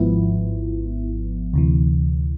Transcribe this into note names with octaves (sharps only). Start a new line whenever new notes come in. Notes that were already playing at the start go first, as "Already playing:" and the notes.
Already playing: G#1 G#2 F3 B3 E4
D2 C3 E3